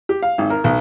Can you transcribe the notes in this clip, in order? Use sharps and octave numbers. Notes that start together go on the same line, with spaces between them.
G4
F5
G#1
A#4
B1